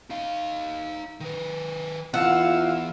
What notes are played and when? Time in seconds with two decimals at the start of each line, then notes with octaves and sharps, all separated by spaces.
0.10 D#4 F5
1.21 D#3 B4
2.14 E3 B3 E4 F4 F5 F#5 E6